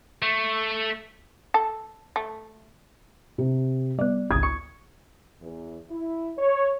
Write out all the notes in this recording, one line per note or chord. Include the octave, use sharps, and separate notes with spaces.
A3
A4
A3
C3
G3 B3 D5
G#1 C#2 D#6 G#6
C#6 C#7
E2
E4
C#5